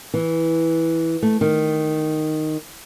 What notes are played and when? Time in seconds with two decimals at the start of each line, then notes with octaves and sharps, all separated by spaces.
0.14 E3
1.23 A3
1.41 D#3